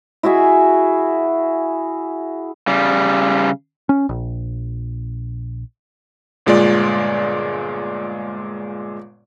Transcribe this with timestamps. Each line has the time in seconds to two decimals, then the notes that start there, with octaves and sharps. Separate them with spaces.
0.23 E4 F#4 G#4 E5
2.67 C#3 G3
3.89 C#4
4.09 A#1
6.46 G1 A#2 G#3 F4 D5